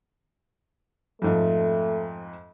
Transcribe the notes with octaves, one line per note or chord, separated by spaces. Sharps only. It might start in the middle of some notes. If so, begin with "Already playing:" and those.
F2 G#2 F3 A3